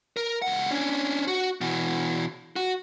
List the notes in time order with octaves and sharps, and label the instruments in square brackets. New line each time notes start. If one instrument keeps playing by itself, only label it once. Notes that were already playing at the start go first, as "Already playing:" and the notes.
[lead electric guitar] A#4
C#2 F#5
C#4 D4
F#4
B2 E3
F#4